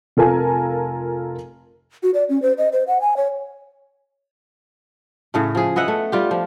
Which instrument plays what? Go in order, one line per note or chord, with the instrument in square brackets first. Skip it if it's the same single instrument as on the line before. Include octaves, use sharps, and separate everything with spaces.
[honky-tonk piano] F1 F4 A4 A#4 G#5 A5
[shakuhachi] F#4
D5
C#4
C5
D#5
C5
F#5
G#5
C#5
[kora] A2 C#3 A3
F3 G#4
B3 D#5 E5 F#5
A3
G3 F4 G4
F3